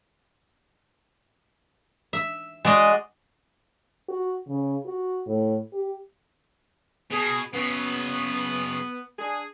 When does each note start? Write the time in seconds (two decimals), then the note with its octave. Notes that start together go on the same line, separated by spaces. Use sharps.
2.13 E5
2.65 G#3 F#4 D5 D#5
4.09 F#4
4.48 C#3
4.85 F#4
5.26 A2
5.73 G4
7.11 B2 G#4
7.54 C#3 F#3 B3
9.19 D4 G#4